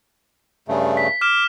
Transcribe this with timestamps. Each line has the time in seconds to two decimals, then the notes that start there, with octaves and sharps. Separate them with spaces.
0.68 G2 C#3 A3
0.97 B6
1.21 D6 F6 E7